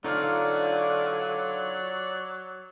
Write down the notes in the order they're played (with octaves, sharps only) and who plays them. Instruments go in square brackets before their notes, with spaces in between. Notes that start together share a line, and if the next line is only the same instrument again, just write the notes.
[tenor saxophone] D3 [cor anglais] F#3 [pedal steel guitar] D#4 F4 F5 [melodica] C#5 D5